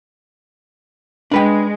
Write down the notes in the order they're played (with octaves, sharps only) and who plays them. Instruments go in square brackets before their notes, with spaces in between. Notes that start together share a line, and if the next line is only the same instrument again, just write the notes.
[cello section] G#3 [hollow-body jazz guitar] D4 B4 G5